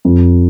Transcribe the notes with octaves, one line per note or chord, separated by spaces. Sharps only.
F2